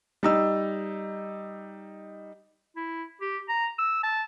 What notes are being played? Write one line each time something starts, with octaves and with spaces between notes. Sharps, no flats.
G3 D#4 E6
E4
G4
A#5
E6
A5